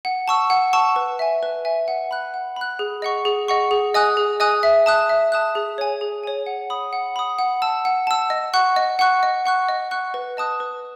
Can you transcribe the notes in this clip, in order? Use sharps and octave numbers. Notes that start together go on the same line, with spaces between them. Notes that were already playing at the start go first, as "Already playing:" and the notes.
F#5
A5 C#6 E6
F#5
A5 C#6 E6
B4
E5 G#5
B4
E5 G#5
F#5
B5 F#6
F#5
B5 F#6
G#4
D#5 F#5 C#6
G#4
D#5 F#5 C#6
G#4
D#5 G#5 D#6 F#6
G#4
D#5 G#5 D#6 F#6
E5
A5 D#6 F#6
E5
A5 D#6 F#6
G#4
C#5 G#5
G#4
C#5 G#5
F#5
B5 D#6
F#5
B5 D#6
F#5
A5 E6
F#5
A5 E6
D#5
F#5 C#6 F#6
D#5
F#5 C#6 F#6
D#5
F#5 C#6 F#6
D#5
F#5 C#6 F#6
B4
D#5 A5 D#6 F#6
B4